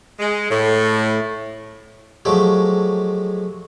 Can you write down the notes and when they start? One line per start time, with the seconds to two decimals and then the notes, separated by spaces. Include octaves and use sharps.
0.19 G#3
0.49 A2
2.25 F3 F#3 G#3 A3 G4